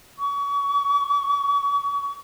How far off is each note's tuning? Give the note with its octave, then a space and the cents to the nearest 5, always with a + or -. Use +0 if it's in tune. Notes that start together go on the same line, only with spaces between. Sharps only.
C#6 +40